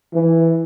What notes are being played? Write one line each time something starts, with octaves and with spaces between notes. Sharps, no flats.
E3